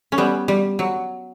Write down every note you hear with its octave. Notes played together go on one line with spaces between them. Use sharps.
C#4
G3 B3
G3
F#3